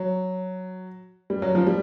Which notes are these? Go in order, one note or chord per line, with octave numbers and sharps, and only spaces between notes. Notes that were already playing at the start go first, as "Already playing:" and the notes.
Already playing: F#3
G3
F#3
F3
G3